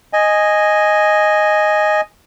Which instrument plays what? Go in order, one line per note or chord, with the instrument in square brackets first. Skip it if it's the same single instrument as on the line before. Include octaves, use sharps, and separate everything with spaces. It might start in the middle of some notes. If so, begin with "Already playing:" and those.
[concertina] D#5 G#5